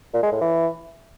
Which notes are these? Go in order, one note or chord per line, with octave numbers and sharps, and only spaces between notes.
A#2
G#3
A2
E3